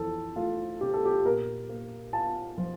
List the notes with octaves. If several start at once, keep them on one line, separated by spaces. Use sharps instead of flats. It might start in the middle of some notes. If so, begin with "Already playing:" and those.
Already playing: F2 E3 A4
A3 F4
C3 G4
A4
G4
A#2 A#4
A#3
F4 A5
F3